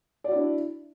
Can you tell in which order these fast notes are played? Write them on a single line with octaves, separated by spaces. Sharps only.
D5 F#4 E4 D4